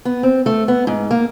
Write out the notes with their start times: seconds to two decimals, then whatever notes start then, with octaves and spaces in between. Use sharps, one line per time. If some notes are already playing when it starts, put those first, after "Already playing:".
0.05 B3
0.23 C4
0.46 A3
0.68 B3
0.87 G#2
1.11 A#3